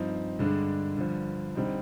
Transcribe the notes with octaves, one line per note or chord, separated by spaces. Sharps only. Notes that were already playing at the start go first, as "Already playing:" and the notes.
Already playing: G2 F3 C4 D#4
G2 D3 G#3 D4
G2 D3 F3
D3 G3 C4 D#4